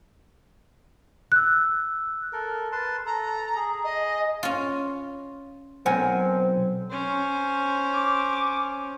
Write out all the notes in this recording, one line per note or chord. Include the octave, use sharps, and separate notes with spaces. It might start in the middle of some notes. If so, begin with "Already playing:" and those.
E6 F#6
A4 A#4
B4 A5 C6
A4 A#5
G#4
D#5
C#4 F4
B1 C4 A#4 F#5 G#5
C#4 C5
D6